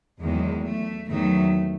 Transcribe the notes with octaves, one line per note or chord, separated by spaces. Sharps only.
E2 D#3 F#3 G#3
A3
E2 D#3 F#3 A3